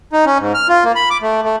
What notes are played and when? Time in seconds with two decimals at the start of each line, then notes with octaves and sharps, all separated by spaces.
0.13 D#4
0.26 C#4
0.39 G#2
0.55 F6
0.69 F4
0.84 A#3
0.95 B5
1.11 D6
1.22 A3
1.44 A3